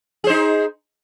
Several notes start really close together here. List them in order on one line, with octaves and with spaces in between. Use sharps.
G#4 C5 D#4